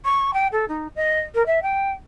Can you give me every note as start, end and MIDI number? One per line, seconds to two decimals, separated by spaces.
0.05 0.33 85
0.33 0.47 79
0.52 0.65 69
0.68 0.87 63
0.96 1.20 75
1.34 1.45 70
1.46 1.62 76
1.62 1.91 79